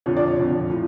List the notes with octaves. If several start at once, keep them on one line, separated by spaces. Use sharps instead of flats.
F2 D3 F3 C#5
D5
C#5
F2 D3 F3
A2 F3